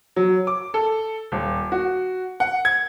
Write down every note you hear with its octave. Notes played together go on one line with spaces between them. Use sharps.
F#3
D6
A4
D#1
F#4
F#5
G#6